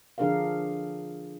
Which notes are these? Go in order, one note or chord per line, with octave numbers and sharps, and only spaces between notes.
D3 F3 D4 G#4 A#4 F5